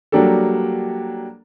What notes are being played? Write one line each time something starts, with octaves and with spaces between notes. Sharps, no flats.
F#3 G3 A#3 D4 G4 A4